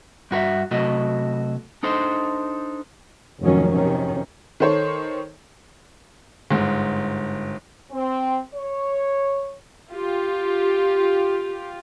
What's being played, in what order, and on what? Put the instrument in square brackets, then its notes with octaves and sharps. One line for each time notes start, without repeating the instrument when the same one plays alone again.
[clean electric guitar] G2 F#4 B4 E5
C3 F#3 A3 F#4 D#5
D4 D#4 A4 C5
[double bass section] F1 G#2 D#3 F3 F#3 C#4
F2 C3 D#3 C#4
[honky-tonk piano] D#3 A4 C5 C#5
[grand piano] G1 G#2
[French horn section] C4
C#5
[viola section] F4 G4